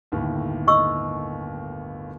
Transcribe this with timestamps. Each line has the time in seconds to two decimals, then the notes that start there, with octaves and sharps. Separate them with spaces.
0.12 G1 D#2 A2
0.67 D#5 C#6 E6